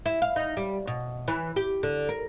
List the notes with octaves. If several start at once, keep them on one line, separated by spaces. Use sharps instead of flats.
E4
F5
D#4
G3
B2
E3
G4
D3
A#4